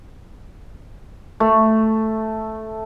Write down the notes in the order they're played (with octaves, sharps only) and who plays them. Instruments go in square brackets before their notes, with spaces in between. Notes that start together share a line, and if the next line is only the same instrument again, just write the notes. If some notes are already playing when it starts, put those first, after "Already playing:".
[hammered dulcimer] A3